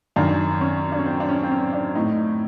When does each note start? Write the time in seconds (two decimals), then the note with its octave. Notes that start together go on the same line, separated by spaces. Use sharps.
0.16 F#2 D#3 D4
0.61 C#4
0.92 D4
0.98 C#4
1.06 C4
1.20 D4
1.29 C#4
1.43 C4
1.51 C#4
1.73 D4
1.95 A2 D#4